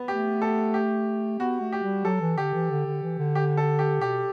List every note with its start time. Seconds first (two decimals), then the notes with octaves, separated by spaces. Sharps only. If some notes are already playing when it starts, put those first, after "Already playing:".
Already playing: B3
0.08 A3 G4
0.42 A4
0.74 G4
1.39 B3 F#4
1.61 A3
1.72 G4
1.83 G3
2.05 F#3 A4
2.21 E3
2.38 D3 G4
2.54 E3
2.70 D3
2.87 D3
3.03 E3
3.19 D3
3.35 G4
3.57 A4
3.79 G4
4.01 B2 G4